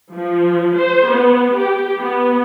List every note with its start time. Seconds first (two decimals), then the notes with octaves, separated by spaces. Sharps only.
0.15 F3
0.78 C5
1.11 B3
1.59 G4
2.00 B3